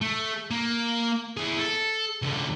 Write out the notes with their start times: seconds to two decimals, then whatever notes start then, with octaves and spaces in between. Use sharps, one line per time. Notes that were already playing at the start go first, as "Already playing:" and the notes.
0.01 A3
0.51 A#3
1.37 E4 G#4
1.59 A4
2.22 C#2 D3